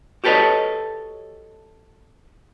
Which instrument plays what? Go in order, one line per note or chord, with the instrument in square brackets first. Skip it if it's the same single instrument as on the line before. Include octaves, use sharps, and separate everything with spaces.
[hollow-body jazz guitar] F#4 G4 A4 B4 C#5 D#5